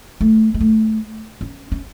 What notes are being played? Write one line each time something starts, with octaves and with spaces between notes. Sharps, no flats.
A3
G#3
A3
C#4
C#4